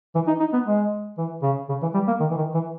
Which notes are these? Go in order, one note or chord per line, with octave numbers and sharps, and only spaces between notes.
E3
D#4
D#4
B3
G#3
E3
C#3
C#3
E3
G3
A#3
D#3
E3
D#3
E3